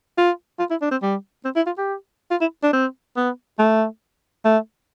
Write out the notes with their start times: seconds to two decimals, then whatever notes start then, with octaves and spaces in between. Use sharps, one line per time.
0.18 F4
0.59 F4
0.71 E4
0.82 D4
0.91 C4
1.02 G3
1.45 C4
1.56 E4
1.66 F4
1.78 G4
2.31 F4
2.41 E4
2.63 D4
2.73 C4
3.17 B3
3.59 A3
4.45 A3